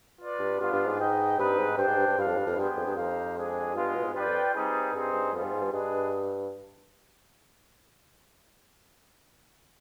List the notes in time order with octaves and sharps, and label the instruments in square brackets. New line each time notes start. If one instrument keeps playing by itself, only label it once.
[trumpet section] F4 B4 D5
[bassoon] G2
[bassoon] G2 [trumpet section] B3 D4 F4
[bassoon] G2
G#2
[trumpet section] D#4 B4 D#5 G5
[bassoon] G2 [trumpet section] G3 C4 D#4 B4
[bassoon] G#2
[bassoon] G2 [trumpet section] D4 G4 C5 G5
[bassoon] G#2
G2
G2
[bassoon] G2 [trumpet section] D4 F4 B4 F5
[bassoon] F2
G2
F2
[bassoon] G2 [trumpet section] B3 D4 G#4 C5 G5
[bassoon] F2
G2
[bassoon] F2 [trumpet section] D#4 G4 C5 F5
[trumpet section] G#3 D4 G#4
[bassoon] G2 [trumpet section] G#3 B3 F4
[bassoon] B2
G#2
[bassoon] G2 [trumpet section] F4 B4 D5 G5
[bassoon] F2
[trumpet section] G3 C4 D#4 G#4 B4
[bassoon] G2 [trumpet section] C4 D#4 G#4 C5
[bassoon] G2
[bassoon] F2 [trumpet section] G3 B3 F4 G#4
[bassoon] G2
G#2
G2
[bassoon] G2 [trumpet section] D4 G#4 B4 D#5